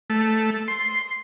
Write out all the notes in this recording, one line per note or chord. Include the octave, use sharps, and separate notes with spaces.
A3
C6